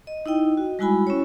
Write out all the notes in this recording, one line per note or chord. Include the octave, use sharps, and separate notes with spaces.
D#5
D#4 E4 D#5 G5
F#4
G3 G#3 E4 F#4 G#5 B5
C#4 E4 C#5